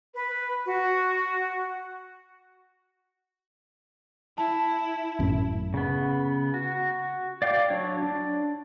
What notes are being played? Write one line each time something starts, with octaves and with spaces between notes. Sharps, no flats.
B4
F#4
E4 A5
G#1 F#2 A2
C#3 B3
F#4
D5 F5 G5 D6
F#3 D4 C#5
D4